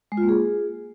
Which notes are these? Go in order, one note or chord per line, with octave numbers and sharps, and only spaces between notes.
G#3
F4
A#3
G#4